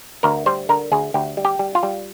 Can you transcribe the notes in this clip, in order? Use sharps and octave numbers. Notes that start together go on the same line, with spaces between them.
D2 A#4
G3 C5
D3 A#4
D2 G#4
D2 G4
G3
G4
G3
F4
G3